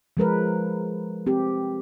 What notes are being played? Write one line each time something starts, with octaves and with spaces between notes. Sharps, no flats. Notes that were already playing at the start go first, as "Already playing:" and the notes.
F3 G#3 A#4 B4
C4 G4